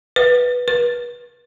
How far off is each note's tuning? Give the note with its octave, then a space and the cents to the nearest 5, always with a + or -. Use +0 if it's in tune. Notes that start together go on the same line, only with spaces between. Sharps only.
B4 -5
B4 -35